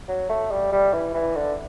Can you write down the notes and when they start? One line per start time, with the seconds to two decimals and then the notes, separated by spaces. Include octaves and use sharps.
0.08 F#3
0.30 A3
0.51 G3
0.72 G3
0.93 E3
1.15 E3
1.35 D3